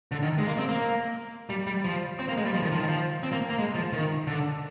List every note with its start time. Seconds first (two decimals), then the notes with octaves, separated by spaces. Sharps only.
0.12 D3
0.23 D#3
0.38 G#3
0.47 A#3
0.58 C4
0.69 A#3
1.50 G3
1.67 G3
1.84 F3
2.19 C4
2.28 A#3
2.37 G#3
2.45 G3
2.54 F3
2.62 D#3
2.72 F3
2.80 D#3
2.88 F3
3.23 C4
3.32 A#3
3.50 A#3
3.59 G#3
3.75 F3
3.93 D#3
4.27 D3